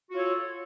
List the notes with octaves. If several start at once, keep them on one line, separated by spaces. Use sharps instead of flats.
F4 F#4 A4 C#5